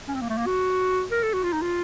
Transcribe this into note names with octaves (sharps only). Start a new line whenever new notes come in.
C#4
C4
A#3
A3
A#3
F#4
A#4
A4
F#4
F4
D#4
F4